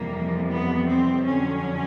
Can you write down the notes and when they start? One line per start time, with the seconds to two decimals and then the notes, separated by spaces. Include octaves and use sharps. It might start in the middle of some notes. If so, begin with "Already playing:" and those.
Already playing: F2 C3 E3 G3 A#3
0.48 B3
0.86 C4
1.26 F2 D3 F#3 C#4